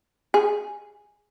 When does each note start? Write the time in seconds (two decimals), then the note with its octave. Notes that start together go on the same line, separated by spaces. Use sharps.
0.34 G#4